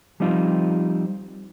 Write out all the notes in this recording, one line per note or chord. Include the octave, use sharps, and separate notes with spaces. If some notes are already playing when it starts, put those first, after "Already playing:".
F3 G3 C4 D#4 F4